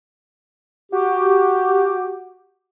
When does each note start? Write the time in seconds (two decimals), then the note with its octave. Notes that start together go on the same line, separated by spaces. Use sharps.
0.92 F#4 G4